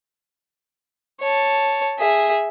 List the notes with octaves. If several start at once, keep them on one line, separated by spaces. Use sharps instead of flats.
C#5 A5
G#4 E5